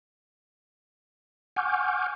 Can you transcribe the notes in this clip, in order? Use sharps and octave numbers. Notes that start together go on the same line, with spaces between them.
F#5 G#5 C#6 D6 F6 G6